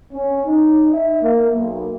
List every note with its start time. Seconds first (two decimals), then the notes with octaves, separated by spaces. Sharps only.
0.14 C#4
0.47 D#4
0.92 E5
1.22 A#3
1.54 B1